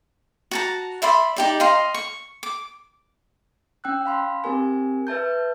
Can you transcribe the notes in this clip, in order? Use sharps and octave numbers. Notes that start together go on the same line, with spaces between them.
F#4 A5 A#5
D5 E5 B5 C6
D#4 G4 D5
D#5 F5 A#5 C6
C#6
D6
C#4 G5 E6 F#6
F5 B5 C6
C4 G4 A#4 G#5
B4 E5 A5 G6